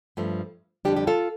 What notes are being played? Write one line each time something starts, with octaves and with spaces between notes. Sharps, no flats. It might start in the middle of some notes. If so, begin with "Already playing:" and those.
G2 F3 A3
F2 D3 G3 D4 G4
G4
F4 A4